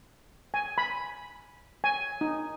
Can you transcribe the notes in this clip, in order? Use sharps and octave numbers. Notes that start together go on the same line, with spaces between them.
G#5
B5
G#5
D#4